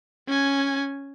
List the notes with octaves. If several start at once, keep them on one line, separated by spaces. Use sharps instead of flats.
C#4 G#5